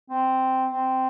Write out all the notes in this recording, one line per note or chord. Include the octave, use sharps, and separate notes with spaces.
C4
C4